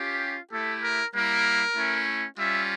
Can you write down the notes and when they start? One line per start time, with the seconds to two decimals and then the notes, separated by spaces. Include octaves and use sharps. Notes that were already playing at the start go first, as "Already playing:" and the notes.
Already playing: C#4 F4 G4
0.51 A3 E4 G4 A4
0.82 A#4
1.13 G3 A#3 E4 A#4
1.76 A3 C#4 E4
2.38 G3 C#4 F4 E5